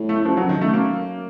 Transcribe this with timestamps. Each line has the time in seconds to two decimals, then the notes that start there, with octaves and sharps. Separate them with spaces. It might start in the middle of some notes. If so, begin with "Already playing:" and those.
Already playing: A2
0.09 A3
0.25 F#2 F3
0.37 F#3
0.41 F#2
0.49 D#3
0.58 F#2 A3
0.73 F#2 A#3